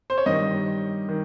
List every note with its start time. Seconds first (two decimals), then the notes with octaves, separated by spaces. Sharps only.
0.10 C5
0.18 C#5
0.26 G2 D#3 D#5
1.09 D#3